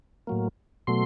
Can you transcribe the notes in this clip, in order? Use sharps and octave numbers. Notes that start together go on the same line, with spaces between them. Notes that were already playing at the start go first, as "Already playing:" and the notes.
A2 F#3 A#3
B2 F#3 A3 C6